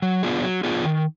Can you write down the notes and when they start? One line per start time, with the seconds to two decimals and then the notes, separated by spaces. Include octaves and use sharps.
0.02 F#3
0.23 B3 D4 F4 G#4
0.43 F#3
0.63 B3 D4 F4 G#4
0.84 D#3